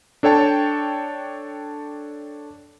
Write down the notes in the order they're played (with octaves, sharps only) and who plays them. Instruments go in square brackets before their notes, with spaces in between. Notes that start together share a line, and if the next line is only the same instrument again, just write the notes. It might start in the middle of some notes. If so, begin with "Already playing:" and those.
[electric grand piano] D4 A4 C#5 G5 A5